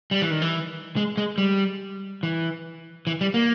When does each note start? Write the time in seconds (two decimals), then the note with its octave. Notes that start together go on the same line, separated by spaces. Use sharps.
0.11 G3
0.22 E3
0.31 D#3
0.42 E3
0.96 G#3
1.17 G#3
1.38 G3
2.23 E3
3.07 E3
3.21 G3
3.34 A#3